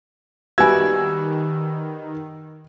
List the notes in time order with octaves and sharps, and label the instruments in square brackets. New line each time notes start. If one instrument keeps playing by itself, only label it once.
[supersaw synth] D#3 [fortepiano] G3 B3 F#4 [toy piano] E5 G#5 [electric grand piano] E6 G#6